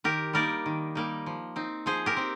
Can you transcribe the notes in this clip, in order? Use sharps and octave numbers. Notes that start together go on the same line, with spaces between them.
D#3 G4 A#4
G3 A#3 D#4 A#4 D5
D#3
G3 A#3 D#4
F3
C4 D#4
F3 G#4 C5
G4 A#4
C4 D#4